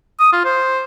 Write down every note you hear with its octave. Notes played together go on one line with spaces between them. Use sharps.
D#6
F4
C5